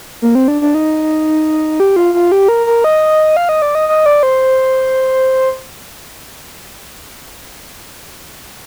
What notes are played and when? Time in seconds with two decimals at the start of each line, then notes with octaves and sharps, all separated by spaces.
0.22 A#3
0.35 C4
0.48 D4
0.61 D4
0.74 D#4
1.80 G4
1.96 F4
2.14 F4
2.32 G4
2.48 A#4
2.66 A#4
2.84 D#5
3.37 F5
3.49 D#5
3.62 D5
3.75 D#5
3.89 D#5
4.06 D5
4.23 C5